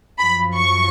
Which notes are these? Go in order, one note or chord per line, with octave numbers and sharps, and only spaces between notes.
F#2 F3 B5
C#6